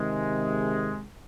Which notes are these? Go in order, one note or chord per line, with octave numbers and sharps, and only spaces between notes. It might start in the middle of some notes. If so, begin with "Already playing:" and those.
Already playing: C3 D#3 G#3